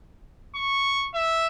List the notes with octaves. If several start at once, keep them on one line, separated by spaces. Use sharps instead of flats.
C#6
E5